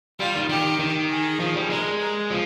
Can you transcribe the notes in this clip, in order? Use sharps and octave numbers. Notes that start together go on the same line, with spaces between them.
G3 F4
D#3
D#3 G4
D#3
G#4
F3
G3
G#3 A#4
A#4
F3